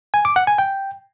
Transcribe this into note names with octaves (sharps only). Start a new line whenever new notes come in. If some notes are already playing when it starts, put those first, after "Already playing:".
G#5
D6
F#5
G#5
G5